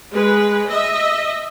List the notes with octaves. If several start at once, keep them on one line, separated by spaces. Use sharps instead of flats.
G#3 B4
D#5 E5